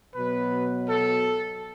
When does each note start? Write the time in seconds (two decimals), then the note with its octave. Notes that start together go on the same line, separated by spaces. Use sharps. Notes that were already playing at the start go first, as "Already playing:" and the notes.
0.16 B2 F#3 B4
0.89 A4